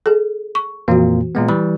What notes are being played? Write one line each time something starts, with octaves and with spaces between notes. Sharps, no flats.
G#4 A4
C#6
F2 A#2 E3 A#3 F#4
A#2 G#3 B3
E3 G3 B5